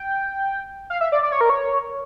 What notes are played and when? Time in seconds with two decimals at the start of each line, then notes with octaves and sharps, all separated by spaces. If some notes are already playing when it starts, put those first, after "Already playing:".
Already playing: G5
0.90 F5
1.01 E5
1.12 D5
1.23 D5
1.32 C#5
1.41 A#4
1.50 C#5